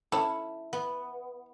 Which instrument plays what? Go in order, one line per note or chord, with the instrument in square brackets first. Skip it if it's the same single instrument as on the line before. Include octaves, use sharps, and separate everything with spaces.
[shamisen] C#4 A4 [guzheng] E4
[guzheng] B3